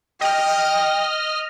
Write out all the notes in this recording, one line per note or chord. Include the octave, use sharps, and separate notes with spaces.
D#5 G5 F6